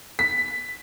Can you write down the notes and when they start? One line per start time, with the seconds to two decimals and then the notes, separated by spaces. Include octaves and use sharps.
0.19 B6